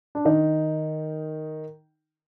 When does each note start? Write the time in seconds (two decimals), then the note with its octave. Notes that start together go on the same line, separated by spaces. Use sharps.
0.15 D4
0.25 D#3 D#4